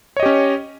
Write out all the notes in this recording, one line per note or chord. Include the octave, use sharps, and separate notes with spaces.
C#4 G4 C#5 D#5